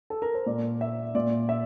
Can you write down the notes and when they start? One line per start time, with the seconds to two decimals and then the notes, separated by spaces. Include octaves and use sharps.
0.10 A4
0.22 A#4
0.34 C5
0.46 A#2 D5
0.81 E5
1.15 A#2 D5
1.49 E5